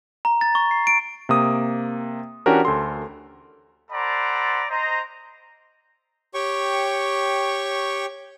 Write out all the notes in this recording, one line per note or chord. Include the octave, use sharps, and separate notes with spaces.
A#5
A6
C#6
C7
D7
C3 A#3 D#6
E3 C#4 D4 F#4 G4 A#4
D2 A4 C6
A4 C5 D5 F#5 A#5 B5
C5 D#5 A#5
G4 C#5 G5 C#6